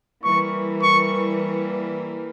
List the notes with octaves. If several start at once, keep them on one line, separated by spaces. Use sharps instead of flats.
E3 G3 A#3 C#6
C#6